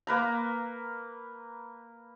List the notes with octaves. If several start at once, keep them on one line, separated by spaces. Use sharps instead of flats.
A#3 B4 A#5